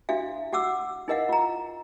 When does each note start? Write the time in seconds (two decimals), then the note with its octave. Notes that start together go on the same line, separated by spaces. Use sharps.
0.09 D4 E4 F#4 E5 F5
0.53 F#4 F#5 D6 E6
1.08 D#4 E4 A#4 D#5 F5 F#5
1.29 F4 A#5